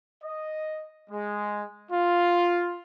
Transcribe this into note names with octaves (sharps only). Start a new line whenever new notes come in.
D#5
G#3
F4